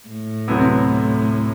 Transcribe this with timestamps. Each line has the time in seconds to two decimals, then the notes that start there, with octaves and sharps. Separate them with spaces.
0.09 A2
0.48 D2 C3 F#3 B3 E4